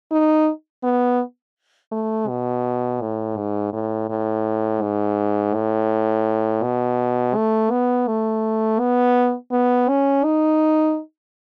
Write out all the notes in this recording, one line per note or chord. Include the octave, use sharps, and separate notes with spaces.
D#4
B3
A3
B2
A2
G#2
A2
A2
G#2
A2
B2
A3
B3
A3
B3
B3
C#4
D#4